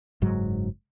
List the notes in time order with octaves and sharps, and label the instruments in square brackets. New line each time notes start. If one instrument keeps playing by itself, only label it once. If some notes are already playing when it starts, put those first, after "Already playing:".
[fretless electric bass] F#1 G#2 F#3